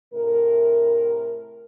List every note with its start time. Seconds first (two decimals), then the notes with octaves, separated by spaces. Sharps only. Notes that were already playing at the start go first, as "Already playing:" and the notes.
0.14 A2 C3 A#4